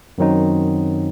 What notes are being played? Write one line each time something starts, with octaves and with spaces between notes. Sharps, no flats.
F#2 D#3 F#3 C4 D#4